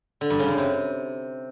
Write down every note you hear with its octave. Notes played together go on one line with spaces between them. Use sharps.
D3
G2
C#3
F#2
C3